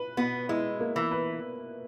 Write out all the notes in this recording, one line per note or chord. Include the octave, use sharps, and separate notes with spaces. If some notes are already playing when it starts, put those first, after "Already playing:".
Already playing: B4
B2 B3
G#3 E4
A#3
E3
B4